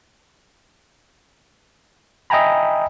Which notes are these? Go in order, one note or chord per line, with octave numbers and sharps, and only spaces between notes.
D#5 E5 G5 G#5 A#5 B5